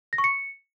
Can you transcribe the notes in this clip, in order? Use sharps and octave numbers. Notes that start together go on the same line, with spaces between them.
A#6
C#6
C#7